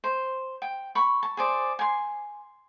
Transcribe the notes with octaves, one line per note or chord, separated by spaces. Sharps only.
C5
G5
B5 C#6
A5
G#4 C5 D5
G#5 C6